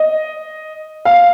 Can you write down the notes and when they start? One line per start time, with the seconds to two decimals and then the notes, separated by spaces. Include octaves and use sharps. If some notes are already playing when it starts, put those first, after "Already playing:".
Already playing: D#5
1.05 F5